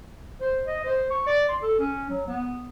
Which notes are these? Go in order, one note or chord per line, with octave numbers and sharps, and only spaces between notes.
C5
D#5
C5
C#6
D5
C6
A4
C#4
F#3
B3